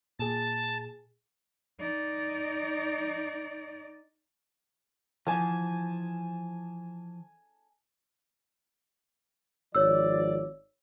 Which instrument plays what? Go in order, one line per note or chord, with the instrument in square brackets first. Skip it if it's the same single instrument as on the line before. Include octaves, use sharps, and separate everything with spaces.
[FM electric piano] A#2 G#4 [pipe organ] A5
[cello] D#4 D5
[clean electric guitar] E3 F3 [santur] G#5 A5
[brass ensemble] G#1 F3 D5 [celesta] C#5 E6